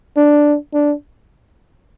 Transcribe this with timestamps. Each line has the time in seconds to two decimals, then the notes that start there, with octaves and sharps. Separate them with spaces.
0.17 D4
0.73 D4